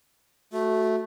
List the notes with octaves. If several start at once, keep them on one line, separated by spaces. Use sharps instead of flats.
A3 F#4